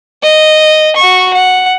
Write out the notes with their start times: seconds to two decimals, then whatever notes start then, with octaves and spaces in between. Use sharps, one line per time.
0.23 D#5
0.96 F#4 C#6
1.34 F#5